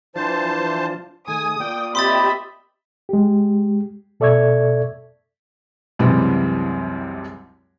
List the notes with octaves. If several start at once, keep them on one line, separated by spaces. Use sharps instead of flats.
E3 F3 D4 F4 C5 A5
D#3 A3 G#4 G#5 D#6
A#3 F4 D5 G5
C4 G4 D#5 E5 B5 C6 D#6 A6
G#3 G4
B2 A4 D5 E5 C#6 G#6
C2 F#2 C3 E3 G3 G#3